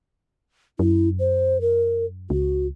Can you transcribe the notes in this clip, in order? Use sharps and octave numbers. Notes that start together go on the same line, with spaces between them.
F#2 E4
C5
A#4
C#2 F#4